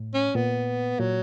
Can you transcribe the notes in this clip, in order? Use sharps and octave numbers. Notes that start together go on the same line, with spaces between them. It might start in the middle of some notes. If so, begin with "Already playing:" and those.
Already playing: A2
C#4
A#2 B3
A#2 F#3